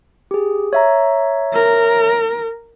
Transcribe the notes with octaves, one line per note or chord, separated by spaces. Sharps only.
G4 G#4
C#5 E5 A#5
A#4